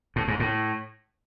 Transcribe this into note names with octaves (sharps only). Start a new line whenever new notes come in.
A2
G#2
A2